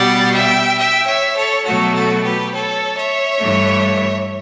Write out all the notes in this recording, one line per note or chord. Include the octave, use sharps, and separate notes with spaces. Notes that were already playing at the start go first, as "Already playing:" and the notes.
Already playing: B2 G3 D5 F#5
E5 G5
E5 G5
C#5 E5
A4 C#5
B2 F#3 A3 F#4 A4
F#4 A4
G4 B4
A4 C#5
C#5 E5
G2 E3 A3